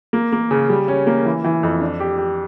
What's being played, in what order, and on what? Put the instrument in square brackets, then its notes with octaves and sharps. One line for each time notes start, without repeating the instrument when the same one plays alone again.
[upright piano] A#3
A#3
C#3
G3
C#4
A#3
E3
E3
F2
D4
G4
G4